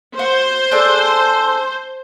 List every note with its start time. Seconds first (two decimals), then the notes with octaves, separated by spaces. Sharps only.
0.19 F#4 C5
0.71 D4 G#4 A4